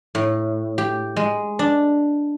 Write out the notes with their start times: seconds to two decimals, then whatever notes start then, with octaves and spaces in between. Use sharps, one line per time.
0.15 A2
0.78 G4
1.16 G#3
1.59 D4